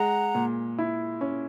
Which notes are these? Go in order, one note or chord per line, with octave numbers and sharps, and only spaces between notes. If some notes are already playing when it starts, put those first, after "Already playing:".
Already playing: G#3 F#5 A#5
A#2
E4
C#4